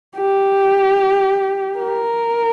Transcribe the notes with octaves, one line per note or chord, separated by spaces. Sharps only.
G4
A#4